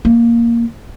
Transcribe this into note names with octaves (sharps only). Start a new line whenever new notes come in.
A#3